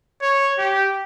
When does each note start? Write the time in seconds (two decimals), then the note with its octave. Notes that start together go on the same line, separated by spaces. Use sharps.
0.22 C#5
0.58 G4